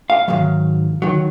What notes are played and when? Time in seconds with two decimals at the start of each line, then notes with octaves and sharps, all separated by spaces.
0.10 F5
0.28 G#2 D#3 F#3 F5
1.02 D#3 F#3